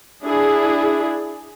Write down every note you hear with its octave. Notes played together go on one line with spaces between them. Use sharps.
D4 E4 G#4